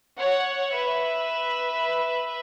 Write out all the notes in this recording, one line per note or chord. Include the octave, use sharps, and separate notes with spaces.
C#5 F#5
B4 E5